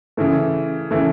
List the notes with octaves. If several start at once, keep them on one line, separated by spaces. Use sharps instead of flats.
C#3 E3 A3
C#3 E3 A3